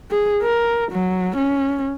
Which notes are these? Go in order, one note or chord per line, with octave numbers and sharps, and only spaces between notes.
G#4
A#4
F#3
C#4